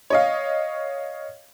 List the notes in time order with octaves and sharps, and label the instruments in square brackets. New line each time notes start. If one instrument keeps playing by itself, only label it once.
[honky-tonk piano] C#5 D#5 F5